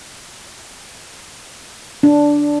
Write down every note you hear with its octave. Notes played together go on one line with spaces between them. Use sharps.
D4